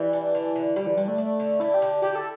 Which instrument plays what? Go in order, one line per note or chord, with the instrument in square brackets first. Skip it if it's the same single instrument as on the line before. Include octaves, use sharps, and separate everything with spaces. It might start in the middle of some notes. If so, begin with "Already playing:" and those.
Already playing: [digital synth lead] E3 [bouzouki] G3
[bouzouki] D4
D3
D3
[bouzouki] D3 [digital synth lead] G3
[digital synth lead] E3
[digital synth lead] G3 [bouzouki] D4
[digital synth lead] A3
[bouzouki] D4
D3
[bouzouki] D4 [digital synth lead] E4
[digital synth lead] G4
[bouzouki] D3
[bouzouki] E4 [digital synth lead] G4
[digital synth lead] A4